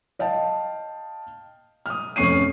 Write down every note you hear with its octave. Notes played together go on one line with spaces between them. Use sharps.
D#5 F5 G5 A5
D#6 F6
F1 C#4 C#6 C7 D#7